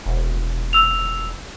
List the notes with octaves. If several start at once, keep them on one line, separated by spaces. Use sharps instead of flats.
E1
E6 F7